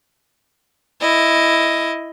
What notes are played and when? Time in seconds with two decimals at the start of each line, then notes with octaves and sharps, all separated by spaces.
1.01 E4 D#5